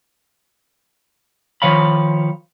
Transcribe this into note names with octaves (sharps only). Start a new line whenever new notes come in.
D#3 F3 C#5 F5 B5